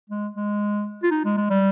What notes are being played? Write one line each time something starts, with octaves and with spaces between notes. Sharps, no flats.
G#3
G#3
F4
D#4
G#3
G#3
G3